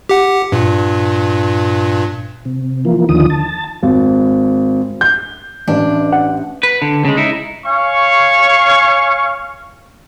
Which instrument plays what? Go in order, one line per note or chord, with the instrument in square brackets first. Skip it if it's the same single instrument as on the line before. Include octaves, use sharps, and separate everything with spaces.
[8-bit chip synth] G4 F#5
G2 A#2
[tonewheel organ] C3
E3 F3 A#3
D#2 D3 D#3 F3 D#6
A5
[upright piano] G#1
[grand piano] G6
[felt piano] A1 [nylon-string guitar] D4
[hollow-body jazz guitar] F#5
[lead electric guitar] B4
D3
C#3 G#3
D#4 E4
[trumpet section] C#5 F5 G#5 C#6